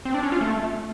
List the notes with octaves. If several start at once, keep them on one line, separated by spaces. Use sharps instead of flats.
C4
D4
C#4
F4
A3